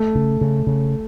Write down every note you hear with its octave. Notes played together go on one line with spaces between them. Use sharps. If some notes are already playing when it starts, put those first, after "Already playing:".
Already playing: A3
C#3
C#3
C#3